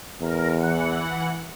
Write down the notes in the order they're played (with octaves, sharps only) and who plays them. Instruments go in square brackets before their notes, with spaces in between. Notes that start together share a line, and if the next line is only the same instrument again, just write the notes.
[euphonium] E2 [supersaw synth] A#4
[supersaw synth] E3 F#5